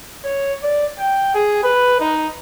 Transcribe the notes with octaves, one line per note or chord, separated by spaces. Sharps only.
C#5
D5
G5
G#4
B4
D#4